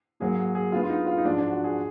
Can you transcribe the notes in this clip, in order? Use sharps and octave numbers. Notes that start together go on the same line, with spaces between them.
G#2 F#3 A#3 G#4
F#4
G#4
D3 G#3 B3 F4
F4
D#4
F4
D#4
G#2 F3 G#3 D4
D4
F#4
G#4